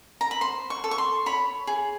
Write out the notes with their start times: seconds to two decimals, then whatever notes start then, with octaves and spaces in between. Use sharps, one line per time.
0.21 A#5
0.31 B5
0.41 C5 C6
0.70 C#6
0.84 A4
0.91 C#6
0.98 C6
1.26 C#5 B5
1.67 G#4